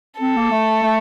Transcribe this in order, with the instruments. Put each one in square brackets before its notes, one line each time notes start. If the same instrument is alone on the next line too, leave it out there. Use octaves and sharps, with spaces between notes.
[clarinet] C4 [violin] A4
[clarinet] A#3
A3
A3